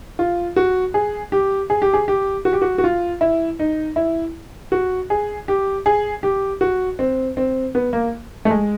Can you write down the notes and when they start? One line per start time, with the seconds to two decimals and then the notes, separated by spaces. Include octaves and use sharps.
0.19 F4
0.56 F#4
0.94 G#4
1.32 G4
1.70 G#4
1.82 G4
1.93 G#4
2.08 G4
2.45 F#4
2.53 G4
2.62 F#4
2.78 F#4
2.84 F4
3.21 E4
3.59 D#4
3.96 E4
4.72 F#4
5.10 G#4
5.48 G4
5.86 G#4
6.23 G4
6.61 F#4
6.99 C4
7.37 C4
7.75 B3
7.93 A#3
8.45 A3
8.50 G#3